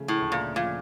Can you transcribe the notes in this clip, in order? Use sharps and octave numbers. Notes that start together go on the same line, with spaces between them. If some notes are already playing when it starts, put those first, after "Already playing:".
Already playing: C#3 F3 A3
A2
D2
A#2
A#2 F3